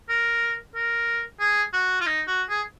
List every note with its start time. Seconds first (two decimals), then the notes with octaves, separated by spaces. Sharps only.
0.09 A#4
0.75 A#4
1.40 G#4
1.73 F#4
2.01 F4
2.06 D#4
2.27 F#4
2.49 G#4